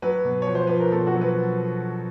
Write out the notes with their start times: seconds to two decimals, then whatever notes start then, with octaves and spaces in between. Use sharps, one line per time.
0.02 F#3 B4
0.25 B2
0.42 F3 C#5
0.55 C5
0.67 F3 B4
0.80 A#4
0.92 B2 A4
1.07 F#4
1.14 F#3
1.21 B4